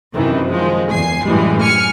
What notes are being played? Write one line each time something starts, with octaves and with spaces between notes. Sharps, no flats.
F#2 C3 D#3 E3
D#3 F3 G#3
E2 G#5 C7
F#2 A2 E3 G3 G#3
G#5 F6 C#7